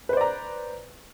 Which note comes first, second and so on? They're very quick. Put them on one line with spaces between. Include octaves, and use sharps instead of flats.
B4 C5 D5 A#5